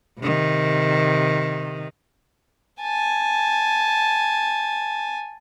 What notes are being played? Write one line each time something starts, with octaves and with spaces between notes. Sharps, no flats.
C3 D#3
G#5 A5